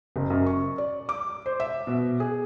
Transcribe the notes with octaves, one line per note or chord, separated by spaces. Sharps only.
F#1
F#2
C#6
D5
D6
C5
E5
B2
G#4